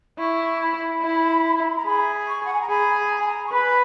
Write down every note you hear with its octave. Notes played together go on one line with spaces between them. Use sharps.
E4 C#6
B5
E4
A#5
G#4 B5
C#6
F#5
G#5
A#5
G#4 B5
A#5
G#5
A#5
C#6
B4 B5